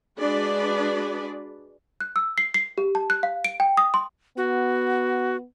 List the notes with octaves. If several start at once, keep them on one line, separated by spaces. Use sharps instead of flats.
G#3 D4 F#4 G#4 B4 D5
F#6
E6
C7
C7
G4
A5
F#6
F5
D7
G5
D#6
C6
B3 F#4